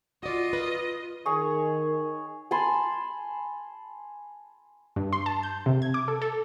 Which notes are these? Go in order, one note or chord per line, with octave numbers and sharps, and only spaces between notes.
F4 F#4 D5 D#5
B4
D#3 G#4 C#5 C#6
G#5 A5 B5 C6
G2
C6
A5
G6
C3
G#6
D6
A4
A4